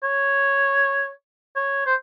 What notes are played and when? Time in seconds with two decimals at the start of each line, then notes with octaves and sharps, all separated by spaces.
0.03 C#5
1.56 C#5
1.86 C5